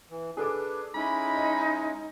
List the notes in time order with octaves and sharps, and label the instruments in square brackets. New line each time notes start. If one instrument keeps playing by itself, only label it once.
[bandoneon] E3
[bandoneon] D4 B4 [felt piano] G#4 A4 D6
[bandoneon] G#3 C#4 E4 [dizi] D#4 [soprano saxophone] B5
[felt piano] D#5